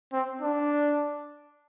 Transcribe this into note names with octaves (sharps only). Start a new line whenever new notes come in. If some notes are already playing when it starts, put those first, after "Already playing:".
C4
D4